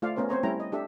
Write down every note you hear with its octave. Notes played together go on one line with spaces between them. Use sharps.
A3 F4 C5 D5 F5
A3 B3 C#4 A#4 C5
C4 C5 C#5 A#5
G3 A3 C#4 E4 G5 A#5
D#5
D4 G4 A4 E5